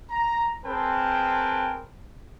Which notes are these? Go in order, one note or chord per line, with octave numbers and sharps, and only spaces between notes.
A#5
C4 G#4 A#4 B4 G5 A5